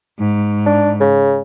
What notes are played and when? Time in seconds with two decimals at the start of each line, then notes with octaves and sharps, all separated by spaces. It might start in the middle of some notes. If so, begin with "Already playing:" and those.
0.18 G#2
0.66 D4
1.00 C#3